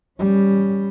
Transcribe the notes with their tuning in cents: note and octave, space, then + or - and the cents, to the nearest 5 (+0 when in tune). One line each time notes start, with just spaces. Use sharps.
G3 +0 C#4 +0